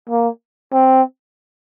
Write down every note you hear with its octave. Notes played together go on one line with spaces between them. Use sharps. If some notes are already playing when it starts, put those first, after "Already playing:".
A#3
C4